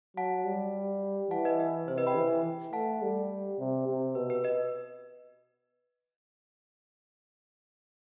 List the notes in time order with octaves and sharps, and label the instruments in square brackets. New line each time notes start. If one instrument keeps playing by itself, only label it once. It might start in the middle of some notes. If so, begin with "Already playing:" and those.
[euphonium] F#3 [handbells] F#5 A5
[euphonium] G3
[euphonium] E3 [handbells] F#5 A5
[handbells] B4 D#5
B4
[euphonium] C3 [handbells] C5
[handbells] B4 D#5
G5 B5
[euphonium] E3
[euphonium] A3 [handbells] F#5 A5
[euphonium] G3
C3
C3
[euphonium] B2 [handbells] B4
[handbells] B4
B4 D#5